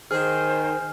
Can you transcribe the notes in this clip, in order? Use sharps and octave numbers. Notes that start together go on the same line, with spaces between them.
D#3 G#4 C5 F6